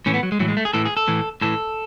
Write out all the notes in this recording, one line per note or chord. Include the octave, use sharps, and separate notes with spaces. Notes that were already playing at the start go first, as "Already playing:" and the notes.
A2 E3 C#4
B3
F#3
G#3
A2 E3 F#3
G#3
A3
G#4
A2 E3 A4
G#4
A4
A2 E3
A2 E3 A4